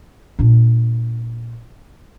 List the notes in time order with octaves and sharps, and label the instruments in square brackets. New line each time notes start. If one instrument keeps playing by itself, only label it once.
[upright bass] A#2 D4